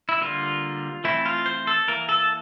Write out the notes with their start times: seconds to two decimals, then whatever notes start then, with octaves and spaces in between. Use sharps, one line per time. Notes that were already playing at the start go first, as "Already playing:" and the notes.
0.09 E4
0.21 D3 G3 A#3 F4
1.04 E3 A3 C4 E4
1.26 F4
1.46 C5
1.67 A4
1.88 E3 A#3 A#4
2.09 A4